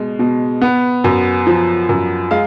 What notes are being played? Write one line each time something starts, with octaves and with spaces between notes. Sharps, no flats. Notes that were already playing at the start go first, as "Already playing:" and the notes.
Already playing: B2 G#3
B2
B3
F#2
F3
F#2
G#3 F5